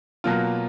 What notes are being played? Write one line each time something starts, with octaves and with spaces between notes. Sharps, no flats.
B2 F#3 A#3 F4